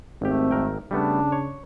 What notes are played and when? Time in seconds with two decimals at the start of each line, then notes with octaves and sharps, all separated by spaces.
0.22 G#1 A3 C4 G4
0.51 G#1 A#4 G5
0.91 C#3 G3 A3 B3 D4
1.32 C#5